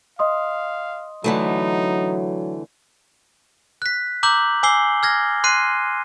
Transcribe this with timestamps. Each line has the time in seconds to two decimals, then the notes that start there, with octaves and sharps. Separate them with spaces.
0.19 D#5 F5 C6 D#6
1.24 D3 E3 F#3 A3 D#4
3.82 F#6 B6
4.23 A#5 D6 E6 G6 F#7
4.63 G#5 D6 E6 C7 G7
5.03 F6 G#6 A#6
5.44 C6 F#6 C7 D#7